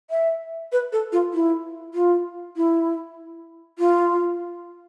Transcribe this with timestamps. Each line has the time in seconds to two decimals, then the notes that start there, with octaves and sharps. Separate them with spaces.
0.10 E5
0.72 B4
0.93 A4
1.12 F4
1.34 E4
1.94 F4
2.57 E4
3.79 F4